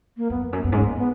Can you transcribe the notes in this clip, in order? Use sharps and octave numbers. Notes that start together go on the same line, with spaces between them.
A#3
F#2 B3
F2
F#2
A#3
F#2 B3
G#2 C#4
A#2
A#3
B3